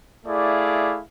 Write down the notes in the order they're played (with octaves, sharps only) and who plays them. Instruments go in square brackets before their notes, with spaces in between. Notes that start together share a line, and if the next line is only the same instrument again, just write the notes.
[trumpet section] A3 E4 G#4 D5 F5